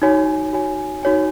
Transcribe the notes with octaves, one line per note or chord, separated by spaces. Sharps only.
D#4 F#4 C#5 G#5
D#4 F#4 C#5 G#5
D#4 F#4 C#5 G#5